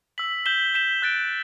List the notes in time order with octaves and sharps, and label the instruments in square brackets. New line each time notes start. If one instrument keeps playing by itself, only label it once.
[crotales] E6 B6 F#7
G6 B6 E7 G7
G6 B6 E7 G7
F#6 A6 D7